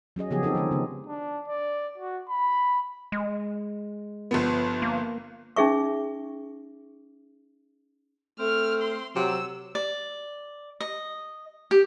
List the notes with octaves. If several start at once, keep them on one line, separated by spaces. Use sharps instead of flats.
F#3 C#4 G#4 D#5
C#3 F3 B3 G4 G#4
C4 D#4 G4 A4
D3 D#3 F3 G#3 C#4
C#3 B3
D4
D5
F#4
B5
G#3
G1 F3 B3
A#3
C#4 D#4 G#4 E5 C#6
A3 C4 F6
C6
C3 F#3 E6
D5
D#5
G4